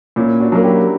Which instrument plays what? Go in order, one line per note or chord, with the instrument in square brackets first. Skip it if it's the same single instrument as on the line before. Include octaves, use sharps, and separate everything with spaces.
[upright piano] A#2 [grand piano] C#4 E4
[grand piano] D4 F#4
[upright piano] F#3 A#3 [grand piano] F#4
[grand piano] E4 G4